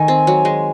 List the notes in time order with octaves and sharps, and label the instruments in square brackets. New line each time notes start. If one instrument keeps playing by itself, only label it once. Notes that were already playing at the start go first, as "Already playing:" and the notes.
Already playing: [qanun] D#3 A3 [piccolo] G#5
[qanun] C4
F#3
G#3